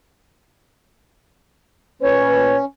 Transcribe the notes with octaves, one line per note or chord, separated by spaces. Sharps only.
A#2 C#4 B4 C#5